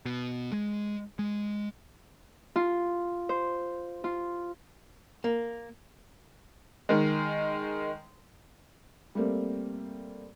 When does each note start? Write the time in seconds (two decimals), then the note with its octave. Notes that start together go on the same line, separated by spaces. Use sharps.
0.05 B2
0.53 G#3
1.19 G#3
2.56 F4
3.29 C5
4.04 F4
5.24 A#3
6.89 D#3 G#3
9.15 G3 A3 A#3 C4